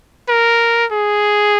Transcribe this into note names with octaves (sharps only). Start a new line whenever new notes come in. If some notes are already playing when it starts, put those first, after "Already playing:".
A#4
G#4